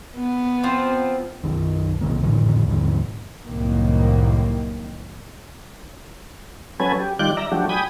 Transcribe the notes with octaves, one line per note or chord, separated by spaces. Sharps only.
B3
F3 C4
B1 F#2 D#3
B1 C3 D#3 A#3
F2 A2 D3 D#3
D#2 G#2 D3 F3
C2 F#2 A2 D#3 A#3
F#3 C#4 A4 B4 G#5
G4
D#3 G3 F4 D5 F#6 G6
D5 E5 A#5
F3 F#3 A3 D4 F#4 G4
G5 G#5 B5 D#6